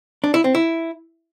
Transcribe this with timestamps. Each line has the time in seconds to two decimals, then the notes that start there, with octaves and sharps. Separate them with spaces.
0.24 D4
0.34 E4
0.44 C4
0.55 E4